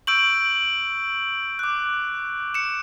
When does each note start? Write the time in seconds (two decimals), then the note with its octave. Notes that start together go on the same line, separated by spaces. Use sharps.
0.07 C#6 E6 G6 D7 F#7
1.59 D6 F#6
2.54 C#7 E7